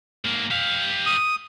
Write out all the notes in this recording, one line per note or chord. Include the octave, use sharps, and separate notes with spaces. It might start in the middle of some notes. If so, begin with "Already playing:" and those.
G#2 A#3
G4 F5
D#6